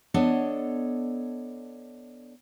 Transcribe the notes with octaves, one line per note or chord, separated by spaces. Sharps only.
B3 D4 A4 C#5 D#5